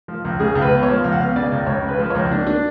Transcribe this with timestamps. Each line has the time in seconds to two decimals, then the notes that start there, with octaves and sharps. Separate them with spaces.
0.08 F3
0.25 C#2
0.40 C#3 G#4
0.55 C#2
0.62 B4
0.71 B3
0.83 C#5
0.88 F3
1.04 C#2 F5
1.12 F#5
1.19 B3 F5
1.36 C#3 D5
1.52 C#2
1.67 C#2 C#5
1.83 C#3
1.88 B4
1.99 F3
2.10 C#2 C#5
2.31 D4
2.47 D4